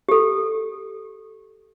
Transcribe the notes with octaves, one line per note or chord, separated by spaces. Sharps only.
G4 A4